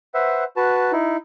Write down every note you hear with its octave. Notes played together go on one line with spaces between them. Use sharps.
B4 C5 E5 F#5
F#4 B4 A5
D#4 E4